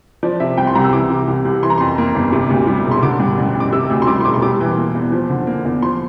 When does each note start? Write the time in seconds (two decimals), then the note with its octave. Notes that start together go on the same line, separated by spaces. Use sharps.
0.23 F3 D5
0.40 C3 E5
0.58 C2 G5
0.67 C6
0.75 C2 A#5
0.84 E6
0.93 E3 D6
1.10 C3
1.28 C2
1.45 C2
1.63 E3 C6
1.70 A#5
1.78 F2 C6
1.98 A#3
2.15 G1
2.32 C3
2.50 D2
2.67 G3
2.85 E1
2.91 C6
3.02 D3 D6
3.20 G2
3.38 A1
3.55 A1
3.60 D6
3.73 C3 E6
3.90 D2 E6
4.02 C6
4.07 G3 D6
4.21 C6
4.25 E1 D6
4.34 C6
4.42 G3 D6
4.60 E3
4.77 A#3
4.95 E2
5.12 F3
5.30 D3
5.47 A#3
5.65 E2
5.82 F3 C6